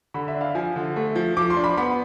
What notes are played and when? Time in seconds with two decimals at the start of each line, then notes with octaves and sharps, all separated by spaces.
0.14 D3 B5
0.28 E5
0.34 D4
0.41 F5
0.55 F3 G#5
0.76 D3
0.96 A3
1.16 F3
1.37 F3 D6
1.50 C6
1.57 D4
1.64 B5
1.77 B3 B5